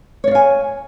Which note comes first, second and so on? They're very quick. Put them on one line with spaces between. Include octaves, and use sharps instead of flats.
C#5 D5 F5 G#5